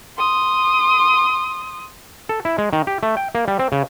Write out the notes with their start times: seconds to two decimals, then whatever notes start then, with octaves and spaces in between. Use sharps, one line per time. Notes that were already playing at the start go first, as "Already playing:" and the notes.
0.18 C6 D#6
2.29 A4
2.45 E4
2.58 G#3
2.73 D#3
2.87 G4
3.03 A3
3.17 G5
3.35 A#3
3.48 G3
3.59 C4
3.72 C#3